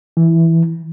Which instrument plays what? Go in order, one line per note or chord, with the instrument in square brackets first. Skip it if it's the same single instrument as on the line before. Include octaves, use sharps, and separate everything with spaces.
[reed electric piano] E3